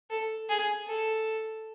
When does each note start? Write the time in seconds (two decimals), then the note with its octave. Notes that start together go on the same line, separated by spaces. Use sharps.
0.10 A4
0.49 G#4
0.88 A4